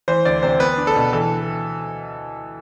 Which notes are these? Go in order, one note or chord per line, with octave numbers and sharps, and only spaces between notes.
E3 C5
D2 D5
C3 C5
B3 B4
D4
A4
B2
E3 A4